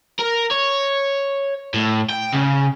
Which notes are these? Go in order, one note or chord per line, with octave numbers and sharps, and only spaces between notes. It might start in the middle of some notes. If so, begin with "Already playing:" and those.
A#4
C#5
A2
G5
C#3